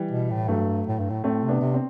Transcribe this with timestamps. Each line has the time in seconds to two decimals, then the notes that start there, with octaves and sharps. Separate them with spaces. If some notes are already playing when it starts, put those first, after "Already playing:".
Already playing: E3 G3
0.11 B2
0.30 A2
0.48 G2 F#3 A3
0.87 A2
0.99 G2
1.10 A2
1.24 A2 A3 C4
1.43 C3
1.48 B3 D4
1.61 C3
1.74 C4